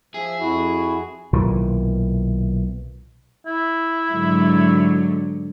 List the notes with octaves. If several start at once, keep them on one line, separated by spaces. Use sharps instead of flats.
F3 G#4 E5
F2 E4 F#4
B1 A#2 D#3 E3
E4
G#2 D3 F#3